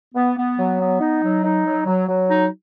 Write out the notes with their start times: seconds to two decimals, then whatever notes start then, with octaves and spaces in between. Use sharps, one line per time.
0.15 B3
0.36 B3
0.57 F#3
0.80 B3
1.00 D#4
1.22 F#3
1.44 D#4
1.65 F#3
1.86 F#3
2.08 F#3
2.28 D#4